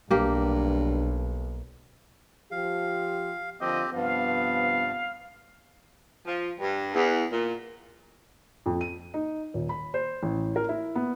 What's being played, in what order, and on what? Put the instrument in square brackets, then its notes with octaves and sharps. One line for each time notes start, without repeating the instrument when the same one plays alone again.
[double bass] B1 [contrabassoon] G2 [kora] A#3 G4
[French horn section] F3 G4 [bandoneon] F5
[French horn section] D3 F3 A#3 [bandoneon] C4 G4 [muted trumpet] D#5
[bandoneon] G2 [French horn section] C3 F3 B3 [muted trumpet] F5
[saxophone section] F3
G2
E2
A#2
[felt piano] F2
D#7
D#4
D#1
B5
C5
A1
A#4
E4
B3